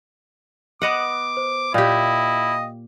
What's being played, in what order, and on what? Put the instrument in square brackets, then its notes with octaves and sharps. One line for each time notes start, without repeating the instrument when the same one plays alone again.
[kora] B3 D#5 F#5 [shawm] D6
[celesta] C5
[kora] A#2 G4 [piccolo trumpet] E4 [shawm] D#5 [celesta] F5 G5